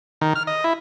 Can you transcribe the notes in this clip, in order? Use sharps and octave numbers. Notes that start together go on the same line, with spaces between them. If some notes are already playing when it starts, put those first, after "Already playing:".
D#3
F6
D#5
E4